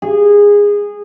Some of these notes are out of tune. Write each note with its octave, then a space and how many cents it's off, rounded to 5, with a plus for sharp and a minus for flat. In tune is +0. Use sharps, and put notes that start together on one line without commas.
G#4 -20